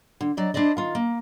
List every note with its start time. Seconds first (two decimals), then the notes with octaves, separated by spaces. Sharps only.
0.21 D3
0.37 F#3 D5 D#5
0.54 D4 E4 C5 D5 D#5
0.77 D#3 F4
0.95 A#3